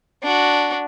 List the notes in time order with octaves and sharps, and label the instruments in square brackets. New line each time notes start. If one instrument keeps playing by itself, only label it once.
[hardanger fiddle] D4 F#4